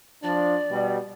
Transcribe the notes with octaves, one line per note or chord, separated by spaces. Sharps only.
F3 D4 D5
B2 G3